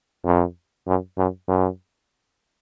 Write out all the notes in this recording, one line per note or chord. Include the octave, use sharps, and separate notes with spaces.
F2
F#2
F#2
F#2